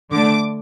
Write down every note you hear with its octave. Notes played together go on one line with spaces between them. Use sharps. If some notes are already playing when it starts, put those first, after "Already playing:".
D3 A3 D4 D6